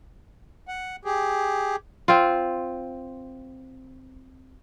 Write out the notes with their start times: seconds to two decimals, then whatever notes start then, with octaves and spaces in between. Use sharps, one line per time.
0.68 F#5
1.05 G4 G#4
2.08 C4 F4